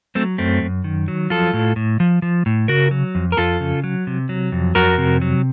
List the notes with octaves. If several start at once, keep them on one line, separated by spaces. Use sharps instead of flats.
F#3 A3 C4
F#2 A3 C4
F#2
D#3
F#3
F3 F4 A4
A2
A2
F3
F3
A2
C#3 F#4 A#4
F#3
F2
A#4
F2 F4 A4
C#3
F#3
C3
F#3
F2
F2 F#4 A#4
C3
F#3